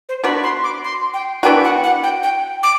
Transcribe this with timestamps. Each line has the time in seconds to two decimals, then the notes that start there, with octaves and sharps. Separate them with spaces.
0.09 C5
0.24 B3 D4 F#4 B5
0.43 C6
0.64 D6
0.84 C6
1.14 G5
1.43 E3 B3 D4 F#4 G5
1.64 F#5
1.84 F#5
2.03 G5
2.23 G5
2.63 D6